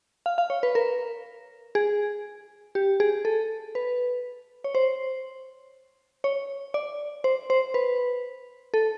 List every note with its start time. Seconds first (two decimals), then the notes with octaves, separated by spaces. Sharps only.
0.26 F5
0.38 F5
0.50 C#5
0.63 B4
0.75 A#4
1.75 G#4
2.75 G4
3.00 G#4
3.25 A4
3.75 B4
4.64 C#5
4.75 C5
6.24 C#5
6.74 D5
7.24 C5
7.50 C5
7.74 B4
8.74 A4